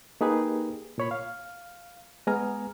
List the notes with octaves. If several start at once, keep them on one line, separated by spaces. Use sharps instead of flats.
A#3 D#4 G4 G#4 B4
A#2 C#5 B5
F5
G#3 B3 G#5 A#5 F6